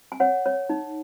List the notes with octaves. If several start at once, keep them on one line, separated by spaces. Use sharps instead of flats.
G#5
C#5 F#5
C#5
D#4